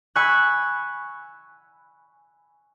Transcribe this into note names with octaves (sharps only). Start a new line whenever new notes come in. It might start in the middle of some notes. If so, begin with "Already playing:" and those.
G#5 B5 C#6 E6 F#6